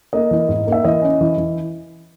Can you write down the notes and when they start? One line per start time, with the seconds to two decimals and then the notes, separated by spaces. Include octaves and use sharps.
0.13 A#3 D#5
0.31 E3
0.49 G#2
0.67 A#3
0.72 E5
0.84 E3 D#5
1.02 C#4
1.21 E3
1.38 E3